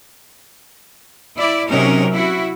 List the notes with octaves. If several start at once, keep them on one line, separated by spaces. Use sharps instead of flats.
E4 D5
C3 F#3 C#4 D#4 A#4
E4 F#4